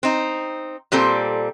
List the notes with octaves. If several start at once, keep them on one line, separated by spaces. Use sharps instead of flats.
C4 D#4
A#2 G3 C4 A4